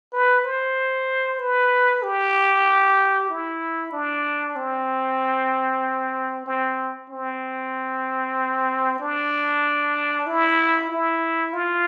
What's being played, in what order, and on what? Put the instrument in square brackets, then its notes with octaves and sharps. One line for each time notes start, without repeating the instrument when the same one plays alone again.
[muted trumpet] B4
C5
B4
G4
E4
D4
C4
C4
C4
D4
E4
E4
F4